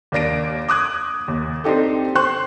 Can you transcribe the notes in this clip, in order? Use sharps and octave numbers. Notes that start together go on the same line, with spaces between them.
D#2 A#3 D4 A#6 D7
D6 D#6 F#6 G#6
D#2
C4 D4 D#4 G4 A4
C5 G5 C6 C#6 F#6